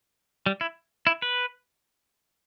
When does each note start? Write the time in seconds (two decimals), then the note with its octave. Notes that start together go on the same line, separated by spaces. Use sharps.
0.46 G3
0.61 E4
1.07 E4
1.22 B4